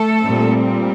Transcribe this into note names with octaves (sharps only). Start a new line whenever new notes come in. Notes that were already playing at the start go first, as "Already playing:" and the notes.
Already playing: A3 A4
A#2 G3 C4